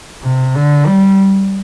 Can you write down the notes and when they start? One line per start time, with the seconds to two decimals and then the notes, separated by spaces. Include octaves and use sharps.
0.23 C3
0.55 D3
0.87 G3